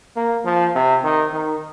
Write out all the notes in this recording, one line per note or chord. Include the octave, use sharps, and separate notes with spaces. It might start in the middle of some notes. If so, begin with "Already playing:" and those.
A#3
F3
C3
D#3
D#3